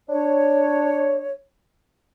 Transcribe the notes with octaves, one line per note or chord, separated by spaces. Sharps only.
D4 C#5